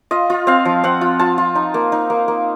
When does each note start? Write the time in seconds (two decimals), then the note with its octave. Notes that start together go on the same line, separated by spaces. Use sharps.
0.11 F4 D#5
0.30 F4
0.47 C4 F5
0.65 F3
0.84 C4 F#5
1.01 F4
1.19 F4 A5
1.38 F4
1.55 D#4
1.74 A#3
1.92 D#4
2.10 A#3
2.28 A#3